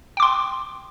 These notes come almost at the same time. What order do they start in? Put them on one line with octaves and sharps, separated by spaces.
G5 D6 C6